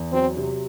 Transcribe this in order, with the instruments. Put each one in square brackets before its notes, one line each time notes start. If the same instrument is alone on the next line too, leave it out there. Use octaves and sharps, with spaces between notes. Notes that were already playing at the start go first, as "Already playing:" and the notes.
Already playing: [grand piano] E2
[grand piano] F#3 [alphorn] C4
[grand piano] C3